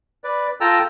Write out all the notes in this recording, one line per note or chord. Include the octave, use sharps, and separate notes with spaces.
B4 D5
F4 A4 G5 A5 A#5 E6